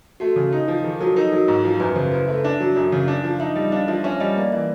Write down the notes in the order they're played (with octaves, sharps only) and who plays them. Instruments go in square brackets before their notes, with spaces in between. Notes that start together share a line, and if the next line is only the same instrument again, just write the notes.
[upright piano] A3 [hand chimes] F#4
[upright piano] C#3
D#4
F3
[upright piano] D#3 [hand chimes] G#4
[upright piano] F#3 [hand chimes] A4
[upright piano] D#4 [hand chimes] A#4
[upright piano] F#3
G#2
F3
[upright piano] F#2 [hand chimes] B4
[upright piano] C#3 [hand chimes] C5
[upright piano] E4 [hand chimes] B4
[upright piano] A3 [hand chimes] E5
[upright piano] D4 [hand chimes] E5
[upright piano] F#3
F#2
C#3
D4
F3
[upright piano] D#4 [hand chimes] E5
[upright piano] G3 [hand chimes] D#5
[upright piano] D4 [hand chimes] F5
[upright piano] F3 [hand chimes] E5
[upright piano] C#4 [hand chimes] E5
[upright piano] G3 [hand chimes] D#5
[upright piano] A#3 [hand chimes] D5
[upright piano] E3 [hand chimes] E5